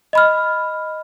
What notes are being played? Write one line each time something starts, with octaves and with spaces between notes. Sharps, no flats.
D#5 B5 F6